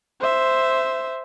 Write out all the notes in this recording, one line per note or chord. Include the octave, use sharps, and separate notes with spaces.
C5 E5